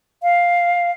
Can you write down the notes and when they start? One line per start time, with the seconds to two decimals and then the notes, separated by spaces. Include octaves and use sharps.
0.23 F5